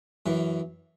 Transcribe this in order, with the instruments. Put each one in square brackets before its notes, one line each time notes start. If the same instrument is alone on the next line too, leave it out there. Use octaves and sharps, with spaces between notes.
[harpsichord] F#2 E3